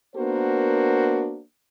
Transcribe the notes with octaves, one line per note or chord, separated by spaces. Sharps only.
A#3 B3 D4 F#4 A#4 C5